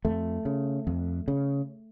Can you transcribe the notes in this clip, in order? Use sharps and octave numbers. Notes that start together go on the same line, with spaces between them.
F2 A3
C#3
F2
C#3